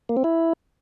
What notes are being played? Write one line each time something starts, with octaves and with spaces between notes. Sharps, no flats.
A#3
C4
E4